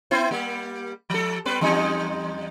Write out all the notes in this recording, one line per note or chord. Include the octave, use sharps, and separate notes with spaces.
B3 E4 C5
G3 A#3
F3 A4
G3 B3 B4
E2 G3 D#4